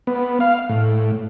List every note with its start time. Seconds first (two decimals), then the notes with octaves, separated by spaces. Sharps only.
0.07 B3
0.40 F5
0.69 A2